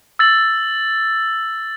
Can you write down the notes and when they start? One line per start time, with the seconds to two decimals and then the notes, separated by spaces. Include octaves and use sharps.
0.19 E6 A6 F#7